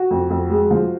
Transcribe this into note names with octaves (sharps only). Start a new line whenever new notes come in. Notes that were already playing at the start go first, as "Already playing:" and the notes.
Already playing: F#4
F2
F2
G#3
F3